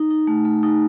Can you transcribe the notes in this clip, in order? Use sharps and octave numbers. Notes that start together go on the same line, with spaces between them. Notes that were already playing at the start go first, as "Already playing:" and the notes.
Already playing: D#4
D#4
A3
A3
D#4